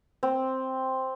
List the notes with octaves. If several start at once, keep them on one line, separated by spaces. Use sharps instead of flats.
C4